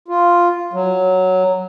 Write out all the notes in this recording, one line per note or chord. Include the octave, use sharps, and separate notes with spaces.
F4
F#3